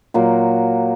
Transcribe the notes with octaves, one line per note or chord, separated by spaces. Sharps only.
A#2 F#3 A#3